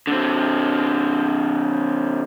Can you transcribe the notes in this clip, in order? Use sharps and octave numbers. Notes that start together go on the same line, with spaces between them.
D3 C4